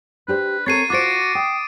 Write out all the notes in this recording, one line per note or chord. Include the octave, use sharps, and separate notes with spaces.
D4 G4 B4 C5
C4 A4 A#4 C#5 A6 C7 D#7
F4 F#4 C5 D6 A6 D7
G5 D#6